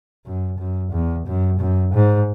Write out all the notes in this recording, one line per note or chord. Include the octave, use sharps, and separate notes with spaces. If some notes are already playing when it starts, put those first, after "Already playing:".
F#2
F#2
E2
F#2
F#2
G#2